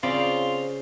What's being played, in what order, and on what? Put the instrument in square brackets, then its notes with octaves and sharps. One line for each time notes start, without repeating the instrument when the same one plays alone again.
[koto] C#3 D5 [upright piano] C4 [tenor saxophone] F4